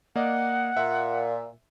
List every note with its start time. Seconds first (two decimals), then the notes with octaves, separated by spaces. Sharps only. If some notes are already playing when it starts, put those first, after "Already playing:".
0.16 A#3 D5 D#5 F#5
0.77 A#2 E5